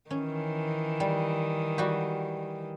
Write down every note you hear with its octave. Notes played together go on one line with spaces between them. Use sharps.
D#3 E3 C#4
G3
G3 F#4 G4